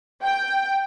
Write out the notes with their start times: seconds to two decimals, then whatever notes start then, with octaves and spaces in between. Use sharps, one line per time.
0.23 G5